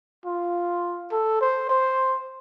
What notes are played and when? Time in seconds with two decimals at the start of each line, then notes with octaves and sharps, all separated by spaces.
0.26 F4
1.12 A4
1.41 C5
1.69 C5